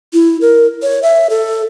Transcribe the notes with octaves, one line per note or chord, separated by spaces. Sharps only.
E4
A#4
C#5
E5
A4